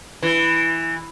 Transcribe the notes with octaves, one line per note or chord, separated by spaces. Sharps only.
E3